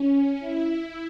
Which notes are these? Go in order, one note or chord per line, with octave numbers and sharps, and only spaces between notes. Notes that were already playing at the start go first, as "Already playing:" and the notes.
Already playing: C#4
E4